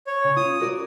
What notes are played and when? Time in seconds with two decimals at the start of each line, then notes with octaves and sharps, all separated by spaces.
0.07 C#5
0.24 C#3
0.37 F4 D#6
0.60 F#4 A#4 D5